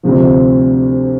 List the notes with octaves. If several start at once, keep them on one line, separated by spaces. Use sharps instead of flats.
D2 C3 F3